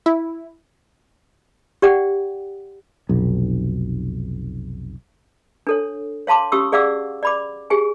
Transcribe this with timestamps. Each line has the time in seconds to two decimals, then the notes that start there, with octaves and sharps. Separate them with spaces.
0.06 E4
1.82 G4 D5 F#5 G5
3.09 F1 B1
5.67 D4 A4 C#5
6.27 C#5 F5 A5 C6 D6
6.52 C#4 F#4 G4 C#6 D#6 E6
6.72 G#4 D5 F5 F#5 D6 E6
7.23 D5 B5 D6
7.70 G4 G#4 G#5